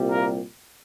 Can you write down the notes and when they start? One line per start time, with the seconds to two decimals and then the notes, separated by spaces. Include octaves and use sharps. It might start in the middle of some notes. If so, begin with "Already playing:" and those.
Already playing: C2 A#2 G3
0.11 A#3 A#4